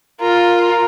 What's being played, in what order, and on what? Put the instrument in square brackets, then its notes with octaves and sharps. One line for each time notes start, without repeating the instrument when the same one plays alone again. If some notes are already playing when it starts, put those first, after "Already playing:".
[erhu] F4 [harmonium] A#4 A#5